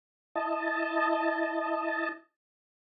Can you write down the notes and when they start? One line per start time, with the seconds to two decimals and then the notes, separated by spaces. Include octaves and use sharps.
0.35 E4 D#5 A5